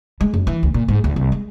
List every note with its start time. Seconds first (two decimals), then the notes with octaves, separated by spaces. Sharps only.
0.21 G#3
0.34 F#2
0.47 E3
0.63 D2
0.74 A#2
0.88 G#2
1.04 D2
1.16 C2
1.32 G#3